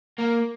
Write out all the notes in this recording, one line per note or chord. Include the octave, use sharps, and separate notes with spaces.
A#3